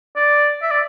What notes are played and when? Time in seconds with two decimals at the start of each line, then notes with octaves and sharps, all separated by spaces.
0.16 D5
0.62 E5
0.71 D5